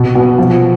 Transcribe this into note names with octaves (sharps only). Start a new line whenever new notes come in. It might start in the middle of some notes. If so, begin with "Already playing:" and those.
Already playing: B2
B2
F3